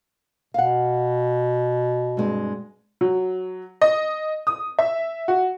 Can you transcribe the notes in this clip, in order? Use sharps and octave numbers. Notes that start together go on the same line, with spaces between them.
B2 F5 F#5
G2 G#3 C4
F#3
D#5
D#6
E5
F#4